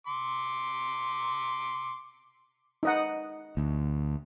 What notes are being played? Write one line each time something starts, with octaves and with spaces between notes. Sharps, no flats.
C6 D6
D#4 D#5 F#5
D2